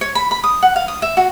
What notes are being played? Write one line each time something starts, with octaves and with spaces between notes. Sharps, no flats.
C#5
B5
B5
D#6
F#5
F5
D#6
E5
F#4